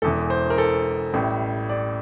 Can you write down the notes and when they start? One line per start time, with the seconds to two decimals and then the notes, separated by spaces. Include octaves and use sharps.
0.02 E1 E2 E3 A4
0.30 C5
0.50 A#4
0.58 A4
1.14 A1 A2 G3
1.69 D5